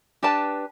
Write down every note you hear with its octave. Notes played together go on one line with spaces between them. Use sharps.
D4 G4 B4 A5